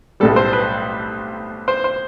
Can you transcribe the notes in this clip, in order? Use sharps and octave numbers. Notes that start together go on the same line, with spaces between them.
B1 A2 G3 A4
C5
B4
C5
C5